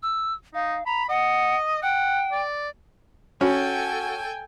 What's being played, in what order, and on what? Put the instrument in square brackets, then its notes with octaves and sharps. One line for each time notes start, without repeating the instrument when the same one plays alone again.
[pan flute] E6
[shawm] D#4 [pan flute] F5
[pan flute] A#5 [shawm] B5
[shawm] D#5 [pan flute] F#5
[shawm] F#5 [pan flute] G5
[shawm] D5
[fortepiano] C#4 [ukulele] F#4 [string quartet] A4 G5 G#5